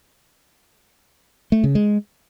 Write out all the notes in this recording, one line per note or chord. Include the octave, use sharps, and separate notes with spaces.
A3
C#3
G#3